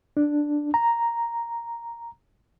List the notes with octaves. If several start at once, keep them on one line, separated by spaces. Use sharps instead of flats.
D4
A#5